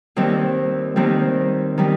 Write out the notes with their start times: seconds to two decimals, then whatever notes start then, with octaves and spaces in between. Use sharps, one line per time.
0.16 D#2 D#3 G3 C4
0.96 D#2 D#3 G3 C4
1.78 D#3 G3 C4